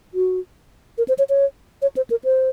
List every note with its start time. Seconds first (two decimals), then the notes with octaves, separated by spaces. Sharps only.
0.14 F#4
0.98 A#4
1.08 C5
1.19 C#5
1.29 C#5
1.82 C#5
1.97 C5
2.10 A#4
2.24 C5